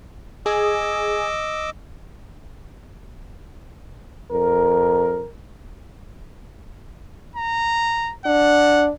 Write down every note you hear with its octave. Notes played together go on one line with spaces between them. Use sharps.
G#4 D#5 D6 E6
F2 A#4
A#5
D4 F#5